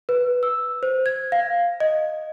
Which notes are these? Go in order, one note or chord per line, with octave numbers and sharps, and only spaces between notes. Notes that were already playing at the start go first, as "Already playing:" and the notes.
B4
E6
C5
G#6
F5
D#5